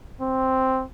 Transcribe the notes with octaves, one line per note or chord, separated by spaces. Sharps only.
C4